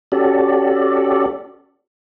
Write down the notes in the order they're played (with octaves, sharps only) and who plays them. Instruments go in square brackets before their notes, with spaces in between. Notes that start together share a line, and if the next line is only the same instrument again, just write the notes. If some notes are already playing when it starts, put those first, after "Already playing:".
[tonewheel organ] C#4 F#4 G4 A4 D5